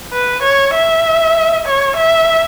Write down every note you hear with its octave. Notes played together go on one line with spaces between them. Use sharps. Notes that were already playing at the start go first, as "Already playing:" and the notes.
B4
C#5
E5
C#5
E5